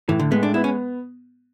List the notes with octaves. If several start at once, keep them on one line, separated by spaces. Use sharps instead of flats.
A2 E3
D3
G#3 B3
D4
B3 E4
C#4